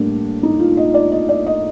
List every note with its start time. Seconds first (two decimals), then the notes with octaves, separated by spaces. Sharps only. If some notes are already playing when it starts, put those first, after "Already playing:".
Already playing: A2 G3 A#3 D4
0.43 D#4
0.59 F4
0.77 D#5
0.94 D5
1.12 D#5
1.29 D5
1.46 D#5